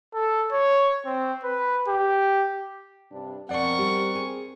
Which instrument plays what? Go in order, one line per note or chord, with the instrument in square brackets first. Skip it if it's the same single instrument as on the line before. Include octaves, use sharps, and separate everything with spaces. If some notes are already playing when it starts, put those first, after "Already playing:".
[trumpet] A4
C#5
C4
B4
G4
[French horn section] G2 C3 D4
[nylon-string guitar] F2 B2 [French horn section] C4 [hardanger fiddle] A#4 C#6 [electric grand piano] D5 F#5
[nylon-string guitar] G3 G4
G#4